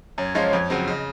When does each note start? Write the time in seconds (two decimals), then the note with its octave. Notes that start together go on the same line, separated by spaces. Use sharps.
0.18 F#2 C#5
0.35 F3 G#3 C#4 F4
0.53 F2
0.70 C#3 F#3 C4
0.87 C#3 D#5